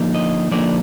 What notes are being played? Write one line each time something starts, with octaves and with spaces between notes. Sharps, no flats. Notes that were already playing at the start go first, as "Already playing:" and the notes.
Already playing: D3 F3 A#3 D#4
D#5
D3 F3 A#3 D#4 D5